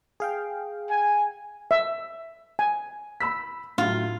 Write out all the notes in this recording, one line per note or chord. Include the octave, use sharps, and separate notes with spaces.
G#4 F5 G5
G#5
E5
G#5
B5 E6 B6
A2 F#3 F4